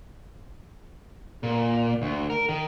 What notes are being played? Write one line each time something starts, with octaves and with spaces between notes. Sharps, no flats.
A#2
D2
A#4
D#3